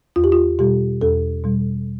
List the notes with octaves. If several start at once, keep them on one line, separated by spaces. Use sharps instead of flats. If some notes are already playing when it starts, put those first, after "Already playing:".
E2 F4
G4
F4
B2 G3 G4
E2 A4
B2 G3